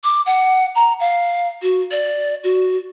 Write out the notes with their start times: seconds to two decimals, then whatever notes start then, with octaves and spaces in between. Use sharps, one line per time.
0.04 D6
0.26 F#5
0.75 A#5
1.00 F5
1.62 F#4
1.91 D5
2.44 F#4